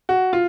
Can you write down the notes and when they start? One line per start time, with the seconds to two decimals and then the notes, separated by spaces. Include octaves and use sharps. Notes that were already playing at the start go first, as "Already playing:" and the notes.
0.09 F#4
0.33 F4